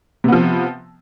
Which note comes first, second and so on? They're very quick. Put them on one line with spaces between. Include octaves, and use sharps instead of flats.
C3 B3 F3